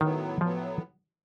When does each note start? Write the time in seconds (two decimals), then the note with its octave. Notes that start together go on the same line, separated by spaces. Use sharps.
0.01 A2 D#3 F#3 B3
0.41 A2 F3 F#3 B3